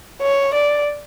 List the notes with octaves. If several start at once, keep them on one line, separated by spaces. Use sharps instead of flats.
C#5
D5